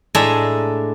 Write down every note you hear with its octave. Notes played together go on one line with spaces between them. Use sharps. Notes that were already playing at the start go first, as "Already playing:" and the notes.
A2 G#3 D4 E5 G#5 A#5